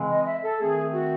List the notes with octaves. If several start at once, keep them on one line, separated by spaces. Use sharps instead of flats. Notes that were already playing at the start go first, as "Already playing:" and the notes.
Already playing: C#3 E3 G#3 C4
D#5
E5
A4
D#3 A3 C4 G#4
F#4